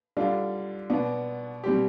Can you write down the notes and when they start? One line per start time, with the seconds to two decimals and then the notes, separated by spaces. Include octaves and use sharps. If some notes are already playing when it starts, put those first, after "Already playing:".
0.17 D3 G3 D4 F4
0.90 B2 B3 D4
1.64 B2 G3 C4 G4